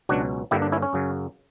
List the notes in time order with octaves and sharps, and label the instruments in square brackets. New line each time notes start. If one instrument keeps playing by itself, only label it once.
[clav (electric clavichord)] C#2 B2 F#3 C#4 D4 F#4
G2 D3 A#3 E4 G4
D4
C#4 E4
C#4
F#2 C#3 F#3